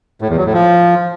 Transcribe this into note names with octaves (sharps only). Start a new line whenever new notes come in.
A2
E2
F#3
A2
F3